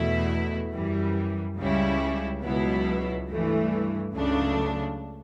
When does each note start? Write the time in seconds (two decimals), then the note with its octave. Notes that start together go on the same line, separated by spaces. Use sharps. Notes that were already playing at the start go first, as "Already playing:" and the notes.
Already playing: E2 B2 A3 E4
0.73 F#2 E3 G3
1.58 C#2 C#3 G3 C#4 E4
2.43 C#2 B2 F#3 B3 E4
3.28 G2 E3 A3
4.13 C#2 C#3 F#3 A3 D4